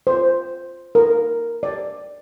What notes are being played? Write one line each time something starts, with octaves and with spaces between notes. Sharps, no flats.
C5
A#4
D5